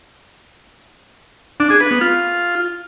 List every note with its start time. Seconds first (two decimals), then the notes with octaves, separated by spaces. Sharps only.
1.60 D4
1.70 G#4
1.80 B4
1.91 B3
2.01 F4